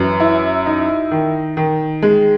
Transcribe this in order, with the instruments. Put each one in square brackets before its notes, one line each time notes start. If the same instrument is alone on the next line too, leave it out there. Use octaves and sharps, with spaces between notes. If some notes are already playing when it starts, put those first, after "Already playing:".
Already playing: [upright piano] F#2 E3
E4
D#4
D#3
D#3
G#3